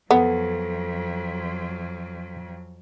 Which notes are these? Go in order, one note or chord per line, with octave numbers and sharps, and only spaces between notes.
F2 F#3 B3 A4